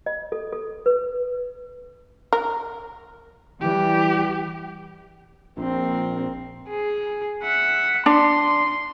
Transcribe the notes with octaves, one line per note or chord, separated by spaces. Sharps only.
D#5
A4
A4
B4
A#4
E3 G3 G4
A#1 C4 A#4 C6
G#4
E5 F#5
D4 C6